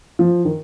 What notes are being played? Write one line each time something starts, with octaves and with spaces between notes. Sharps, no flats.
F3
D#3